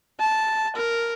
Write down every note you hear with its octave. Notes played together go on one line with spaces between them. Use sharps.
A5
A#4